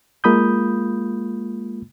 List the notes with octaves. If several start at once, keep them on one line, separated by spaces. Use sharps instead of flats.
G#3 A#3 F4 B5 D#6 G6